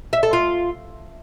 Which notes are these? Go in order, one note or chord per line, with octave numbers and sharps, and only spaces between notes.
E5
A4
F4